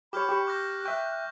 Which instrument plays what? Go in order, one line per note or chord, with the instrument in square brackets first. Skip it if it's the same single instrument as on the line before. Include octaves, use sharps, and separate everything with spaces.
[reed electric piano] G4 C#5 [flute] B5 [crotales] D6 F6 G6
[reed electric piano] G4 C#6
[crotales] D6 G6 A#6 [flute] F#6
[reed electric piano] E5 G5 [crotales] C#6